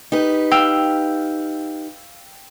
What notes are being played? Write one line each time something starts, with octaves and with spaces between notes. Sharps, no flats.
D#4 G4 B4
F5 G5 E6